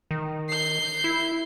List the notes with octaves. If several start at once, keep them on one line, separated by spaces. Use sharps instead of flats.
D#3
G6 C7
E4